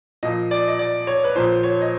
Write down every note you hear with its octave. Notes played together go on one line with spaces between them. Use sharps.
A#2 F3 D#5
D5
D#5
D5
C#5
B4
A#2 F3 C5
C#5
D#5